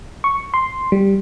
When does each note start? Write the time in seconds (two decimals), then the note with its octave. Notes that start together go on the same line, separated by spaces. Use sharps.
0.24 C#6
0.54 C6
0.92 G3